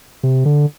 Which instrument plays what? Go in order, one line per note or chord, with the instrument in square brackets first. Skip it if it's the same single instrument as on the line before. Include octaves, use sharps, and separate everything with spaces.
[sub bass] C3
D3